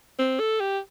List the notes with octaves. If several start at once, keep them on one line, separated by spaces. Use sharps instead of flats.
C4
A4
G4